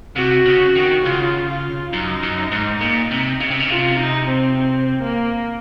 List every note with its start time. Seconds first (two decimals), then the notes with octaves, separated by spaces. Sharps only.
0.16 C3 F#4
0.46 C#3
0.75 D#3
1.05 C#3 F4
1.49 F4
1.93 F#2 D#4
2.23 F#2
2.52 G#2
2.81 A#2
3.11 C3
3.40 C#3
3.50 C3
3.60 C#3
3.70 C3 F4
3.99 D#4
4.29 C4
4.58 C4
5.03 A#3